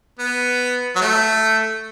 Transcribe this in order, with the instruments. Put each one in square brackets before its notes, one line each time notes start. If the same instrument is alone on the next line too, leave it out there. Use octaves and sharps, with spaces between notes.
[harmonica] B3
F#3
A3